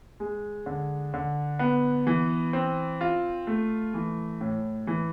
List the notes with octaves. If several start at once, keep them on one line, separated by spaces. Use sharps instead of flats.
G#3
D3
D3
B3
E3
C4
F4
A3
E3
A2
E3